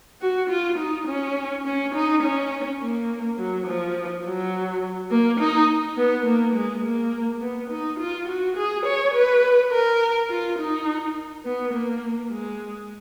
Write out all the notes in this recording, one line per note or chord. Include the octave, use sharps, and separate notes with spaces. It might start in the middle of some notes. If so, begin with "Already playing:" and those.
F#4
F4
D#4
C#4
C#4
D#4
C#4
A#3
F#3
F3
F#3
A#3
D#4
B3
A#3
G#3
A#3
B3
D#4
F4
F#4
G#4
C#5
B4
A#4
F4
D#4
B3
A#3
G#3